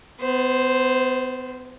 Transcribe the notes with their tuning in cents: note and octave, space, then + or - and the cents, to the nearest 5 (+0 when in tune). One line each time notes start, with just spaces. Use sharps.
B3 +35 C5 +0